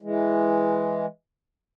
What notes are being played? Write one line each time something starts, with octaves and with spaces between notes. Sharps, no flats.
E3 G#3